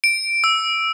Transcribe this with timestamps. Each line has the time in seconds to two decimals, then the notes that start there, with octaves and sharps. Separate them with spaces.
0.04 D7
0.44 E6